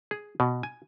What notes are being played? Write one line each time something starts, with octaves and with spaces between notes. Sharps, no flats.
G#4
B2
G#5